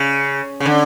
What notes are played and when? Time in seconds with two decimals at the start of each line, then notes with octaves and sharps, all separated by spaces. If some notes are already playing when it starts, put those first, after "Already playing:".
Already playing: C#3
0.60 C#3
0.66 D3